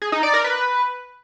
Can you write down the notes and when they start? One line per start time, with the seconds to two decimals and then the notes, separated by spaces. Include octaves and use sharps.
0.02 G#4
0.12 D#4
0.23 D5
0.34 A#4
0.44 B4